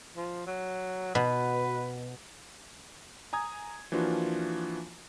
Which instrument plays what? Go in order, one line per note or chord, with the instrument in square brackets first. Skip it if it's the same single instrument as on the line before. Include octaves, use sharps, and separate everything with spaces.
[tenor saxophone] F3
F#3
[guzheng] B2 [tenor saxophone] B4
[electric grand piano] G#5 A#5 D#6 G#6
E3 F3 A#3 D4 F4 F#4